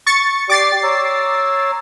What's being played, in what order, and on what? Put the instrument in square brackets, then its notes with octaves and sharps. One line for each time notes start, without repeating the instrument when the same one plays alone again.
[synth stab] C#6 A6 C#7
[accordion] G4 D5 [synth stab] D6 A6 C7
[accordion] C#5 A#5 E6